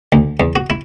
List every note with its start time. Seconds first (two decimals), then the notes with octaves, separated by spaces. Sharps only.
0.12 D2
0.40 E2
0.56 F#4
0.70 E4